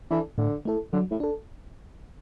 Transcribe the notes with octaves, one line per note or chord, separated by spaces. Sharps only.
E3 D4 A4
A2 D3
A3 E4 A4
D3 F#3
A2
D4 A4